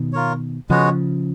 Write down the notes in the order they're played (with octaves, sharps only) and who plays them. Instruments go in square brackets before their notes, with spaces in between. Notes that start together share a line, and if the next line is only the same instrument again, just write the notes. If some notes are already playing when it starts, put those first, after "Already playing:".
Already playing: [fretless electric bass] B2 D#3
[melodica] F4 A#4 C#5
[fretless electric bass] C#3 F3 [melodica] G#3 B3 F#4 C#5